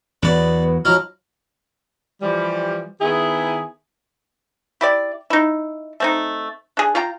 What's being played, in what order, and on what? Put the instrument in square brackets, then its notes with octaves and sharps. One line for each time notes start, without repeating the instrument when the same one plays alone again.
[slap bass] E2 F#3 [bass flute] B3 [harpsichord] B4 D5
[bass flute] F3 [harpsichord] F#3 D#4 E4 [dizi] F6
[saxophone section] E3 F3 G3
D#3 B3 E4 G#4
[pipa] E4 G4 D5
D#4 E4
A3 C4 D#4
D4 G#4
F4 F5 G5 A#5